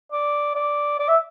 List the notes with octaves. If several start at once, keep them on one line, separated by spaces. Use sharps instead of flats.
D5
D5
D5
E5